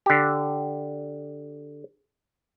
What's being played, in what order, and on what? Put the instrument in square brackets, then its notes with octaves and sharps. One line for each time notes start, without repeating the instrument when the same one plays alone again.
[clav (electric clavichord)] D3 G4